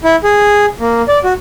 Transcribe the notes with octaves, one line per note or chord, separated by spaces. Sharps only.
E4
G#4
A#3
D5
F#4